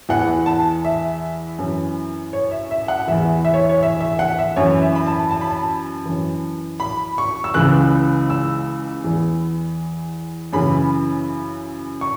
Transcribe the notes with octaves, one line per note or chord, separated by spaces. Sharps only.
E2 E3 F#5
A5
E5
F#2 E3
C#5
E5
E5
F#5
E2 E3 E5
E5
C#5
C#5
E5
E5
F#5
E5
F#2 E3 C#5
E5
B5
A5
A5
B5
A5
F#2 E3
B5
C#6
E6
C#2 C#3 E3 F#6
E6
E2 E3
F#2 C#3 E3 B5
C#6